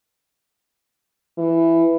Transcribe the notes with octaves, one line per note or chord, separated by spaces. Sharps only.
E3